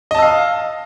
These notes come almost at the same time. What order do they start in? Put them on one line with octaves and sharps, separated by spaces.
D#5 A5 E6 F5